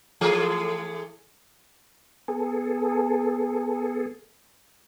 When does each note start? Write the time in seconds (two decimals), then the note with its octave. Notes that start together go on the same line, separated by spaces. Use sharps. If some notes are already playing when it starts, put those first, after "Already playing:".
0.21 E3 A3 G#4
2.28 B3 G#4 A4